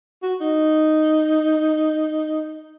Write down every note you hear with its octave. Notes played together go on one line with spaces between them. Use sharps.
F#4
D#4